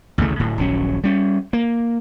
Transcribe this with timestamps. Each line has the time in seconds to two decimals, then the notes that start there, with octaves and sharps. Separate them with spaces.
0.18 A1 D2 C#3 A3
0.39 D1 A2
0.58 D#1 A#1 F#3 C#4
1.04 G3 C#4
1.53 A#3